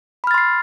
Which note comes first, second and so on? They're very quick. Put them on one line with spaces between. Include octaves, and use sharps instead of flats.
B5 F6 A6 C6 C7